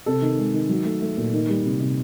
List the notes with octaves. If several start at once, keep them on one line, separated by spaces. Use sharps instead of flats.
C3 A4
D#3
G#3
D#3
F#3
A3
A3
A#2
D#3
G3
C3
C3